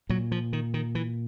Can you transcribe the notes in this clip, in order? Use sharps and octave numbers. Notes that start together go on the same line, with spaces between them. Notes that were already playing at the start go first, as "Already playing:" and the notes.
A#2 F#3
F3
D#3
D#3
E3